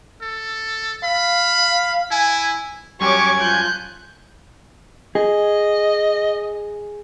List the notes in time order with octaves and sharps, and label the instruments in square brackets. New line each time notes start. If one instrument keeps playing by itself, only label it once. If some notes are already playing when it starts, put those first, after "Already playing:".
[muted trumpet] A4
[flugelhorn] F5 [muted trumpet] B5
[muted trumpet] E4 [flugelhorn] G#5
[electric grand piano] F#2 G3 [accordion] G4 C#5 [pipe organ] G#5 G#6 [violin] C#6 D6
[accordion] F3 F4 [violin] F#6 G6
[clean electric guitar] G#4 [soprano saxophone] D#5